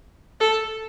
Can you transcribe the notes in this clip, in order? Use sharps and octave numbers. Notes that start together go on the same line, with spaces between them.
A4